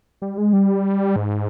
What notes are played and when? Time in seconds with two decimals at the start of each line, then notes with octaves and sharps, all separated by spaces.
0.22 G3
0.38 G#3
0.53 G3
1.16 G#2